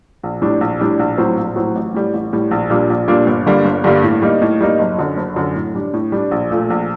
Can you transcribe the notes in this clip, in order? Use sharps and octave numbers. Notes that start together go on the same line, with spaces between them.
A#1
A2 G3 D4
A#1
A2 G3 D4
A#1
A2 F#3 C4
A#1
A2 F#3 C4
A1
A2 G3
A1
A2 G3
A#1
A#2 G3 A#3 D4
A#1
A#2 G3 A#3 D4
G1
G2 D3 G3 A#3
G1
G2 D3 G3 A#3
A2
G3 A#3 D#4
A2
G3 A#3 D#4
F#1
F#2 D3
F#1
F#2 D3
A2
G3 D4
A2
G3 D4
A#1
A#2 A3
A#1